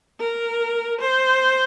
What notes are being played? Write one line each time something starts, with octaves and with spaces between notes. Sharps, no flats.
A#4
C5